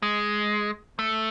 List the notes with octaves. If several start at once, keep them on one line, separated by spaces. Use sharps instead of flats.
G#3
A3